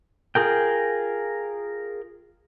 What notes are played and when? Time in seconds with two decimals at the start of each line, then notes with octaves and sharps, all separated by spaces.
0.35 F4 G#4 A#4 G5